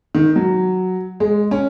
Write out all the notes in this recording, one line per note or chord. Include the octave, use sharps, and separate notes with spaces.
D#3
F#3
G#3
C#4